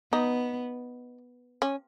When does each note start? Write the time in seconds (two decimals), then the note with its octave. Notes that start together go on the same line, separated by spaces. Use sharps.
0.12 B3 D#4
1.62 C#4